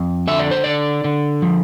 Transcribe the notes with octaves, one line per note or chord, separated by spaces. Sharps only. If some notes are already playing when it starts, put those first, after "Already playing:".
Already playing: F2
D3 E5
D5
C5
D3 D5
D3
F3